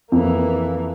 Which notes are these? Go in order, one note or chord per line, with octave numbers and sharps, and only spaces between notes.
F2 E3 A#3